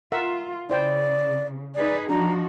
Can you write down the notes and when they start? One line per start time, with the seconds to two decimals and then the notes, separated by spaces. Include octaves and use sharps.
0.12 F4 A#4 E5 F#5
0.70 C#3 E4 C5 D5 G5
1.75 D#4 G#4 B4 D5
2.09 F3 D4 D#4 F#4 A#5